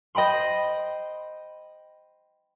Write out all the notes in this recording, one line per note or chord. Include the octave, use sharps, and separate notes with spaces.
C5 D#5 G5 B5 C6